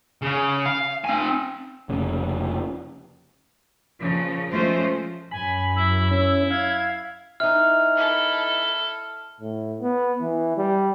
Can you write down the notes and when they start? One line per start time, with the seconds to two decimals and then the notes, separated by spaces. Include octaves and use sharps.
0.22 C#3
0.65 F5
1.05 C4 G#5
1.89 F1 C#3
4.00 A#2 C#3 F3
4.51 F3 G#3 A3 C#4 F4 C5
5.31 F#2 G#5 B5
5.76 E4 E6
6.11 C#4 E4
6.50 F5 G#6
7.40 E3 D#4 F6
7.96 E4 A4
9.41 A2
9.81 B3
10.21 E3
10.57 G3